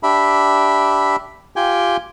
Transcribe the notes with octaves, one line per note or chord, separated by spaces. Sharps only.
D4 G4 E5 B5
F4 G4 G5 G#5